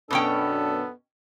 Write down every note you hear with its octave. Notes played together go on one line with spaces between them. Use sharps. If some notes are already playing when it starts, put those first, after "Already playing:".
F#2 B2 B3 C#4 D4 A4 G5